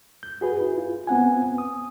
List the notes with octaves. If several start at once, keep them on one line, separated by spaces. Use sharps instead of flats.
G6
F#4 G#4 B4
E4
F4
B3 C4 F#5 G#5
D#6